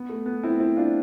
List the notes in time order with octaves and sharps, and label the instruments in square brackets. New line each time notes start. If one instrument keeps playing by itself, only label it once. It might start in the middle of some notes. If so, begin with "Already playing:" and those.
Already playing: [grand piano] B3
A3
B3
C4 E4
C4 E4
D4 F4